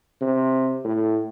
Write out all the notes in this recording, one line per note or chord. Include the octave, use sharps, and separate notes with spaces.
C3
A2